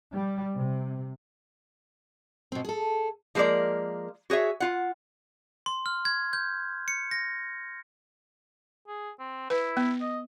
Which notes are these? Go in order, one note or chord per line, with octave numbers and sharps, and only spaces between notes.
G3
C3
B2 C4
G#4 A4
F3 G#3 A#3 A#4 D5
F#4 G#4 C#5 E5
F4 F#5
C6
F6
G#6
G6
C#7
A#6
G#4
C4
E4 B4
B3
D#5